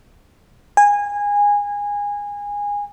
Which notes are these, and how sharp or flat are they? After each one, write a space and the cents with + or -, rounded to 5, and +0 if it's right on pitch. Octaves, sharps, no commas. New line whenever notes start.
G#5 -20